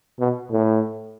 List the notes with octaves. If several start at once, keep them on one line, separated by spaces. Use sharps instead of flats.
B2
A2